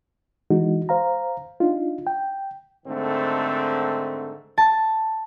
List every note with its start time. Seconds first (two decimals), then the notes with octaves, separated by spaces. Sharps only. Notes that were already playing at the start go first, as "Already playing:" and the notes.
0.51 E3 G#3 D#4 F#4
0.89 C5 F5 A#5
1.60 D4 D#4 F4
2.07 G5
2.86 G#2 D3 D#3 A3 C4
4.58 A5